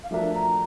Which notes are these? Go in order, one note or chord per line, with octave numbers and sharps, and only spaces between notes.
F5
F3 A3 D4 F#4 A#4 E5
A#5